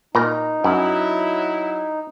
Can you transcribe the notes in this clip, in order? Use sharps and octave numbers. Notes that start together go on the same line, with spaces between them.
A#2 D#4 A#4 A#5
F#2 F#3 E4